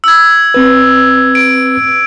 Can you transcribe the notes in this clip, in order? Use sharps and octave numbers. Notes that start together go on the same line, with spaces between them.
E6 G#6
C4 B4
D7